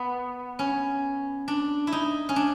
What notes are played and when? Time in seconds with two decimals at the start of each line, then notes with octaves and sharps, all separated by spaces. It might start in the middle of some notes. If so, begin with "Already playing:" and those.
Already playing: B3
0.59 C#4
1.48 D4
1.87 E4
1.92 D#4
2.29 C#4
2.36 D4